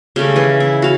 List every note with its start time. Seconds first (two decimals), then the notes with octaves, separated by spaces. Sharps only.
0.16 C#3 G3 A3 A#4
0.36 E3 G#4
0.60 E4
0.82 F#4 F5